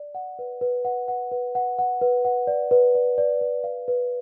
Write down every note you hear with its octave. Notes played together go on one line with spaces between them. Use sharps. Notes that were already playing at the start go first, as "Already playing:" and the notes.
Already playing: D5
F#5
B4
B4
F#5
F#5
B4
F#5
F#5
B4
F#5
D5
B4
D5
D5
B4
F5
B4